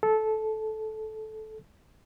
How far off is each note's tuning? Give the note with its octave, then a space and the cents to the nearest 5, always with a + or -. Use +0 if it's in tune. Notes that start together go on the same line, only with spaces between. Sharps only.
A4 -15